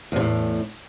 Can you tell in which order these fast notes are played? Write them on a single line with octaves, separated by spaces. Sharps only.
E2 C3 A2